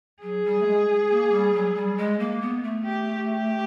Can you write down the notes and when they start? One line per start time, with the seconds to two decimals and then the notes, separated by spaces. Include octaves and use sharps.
0.22 F#3 G#4
0.45 G3
0.60 A3
0.66 G#3
1.10 A#3
1.32 G3
1.54 F#3
1.75 G3
1.98 G#3
2.19 A#3
2.41 B3
2.63 A3
2.85 G4
3.29 G4